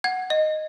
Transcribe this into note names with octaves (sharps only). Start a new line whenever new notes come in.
F#5 G#6
D#5